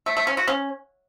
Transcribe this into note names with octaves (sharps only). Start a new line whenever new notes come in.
A3
A3
C#4
F#4
C#4